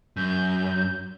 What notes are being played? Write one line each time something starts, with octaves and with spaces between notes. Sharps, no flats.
F#2 G6